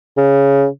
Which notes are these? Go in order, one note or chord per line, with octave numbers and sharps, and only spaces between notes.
C#3